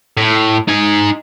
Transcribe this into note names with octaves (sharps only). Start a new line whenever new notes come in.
A2
D#4 G#5